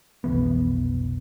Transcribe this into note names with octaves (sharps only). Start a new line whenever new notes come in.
F1 B1 E3 B3